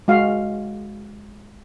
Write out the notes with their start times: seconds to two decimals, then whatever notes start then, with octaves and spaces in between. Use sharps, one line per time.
0.08 G#3 F#4 F5